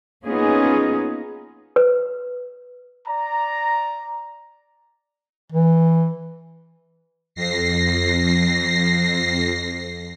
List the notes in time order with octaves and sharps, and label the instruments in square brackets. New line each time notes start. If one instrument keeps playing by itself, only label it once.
[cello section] A#3 B3 C#4 D#4 F4 G#4
[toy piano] B4
[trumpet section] D5 A#5
[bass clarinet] E3
[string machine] F2 A#6 C7